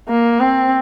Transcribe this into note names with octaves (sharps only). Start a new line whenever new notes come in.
A#3
C4